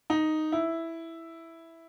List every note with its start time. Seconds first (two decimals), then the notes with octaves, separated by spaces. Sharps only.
0.10 D#4
0.52 E4